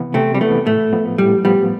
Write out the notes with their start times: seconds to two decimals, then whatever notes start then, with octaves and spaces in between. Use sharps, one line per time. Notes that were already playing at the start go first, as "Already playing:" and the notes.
Already playing: C3 E3 B3
0.14 C3 A3 C4
0.35 G3
0.41 E3 A3 B3
0.67 A2 A3
0.93 F3 B3
1.18 A2 G3
1.45 F3 G3 B3